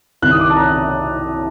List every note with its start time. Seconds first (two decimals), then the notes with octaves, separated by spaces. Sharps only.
0.22 C2 C3 D#3 F#6
0.31 D#6
0.40 D6
0.50 A5
0.56 A#5